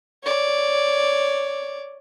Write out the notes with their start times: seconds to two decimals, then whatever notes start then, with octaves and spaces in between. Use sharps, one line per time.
0.23 C#5 D5